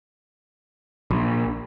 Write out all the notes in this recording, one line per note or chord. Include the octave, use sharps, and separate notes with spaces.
A#1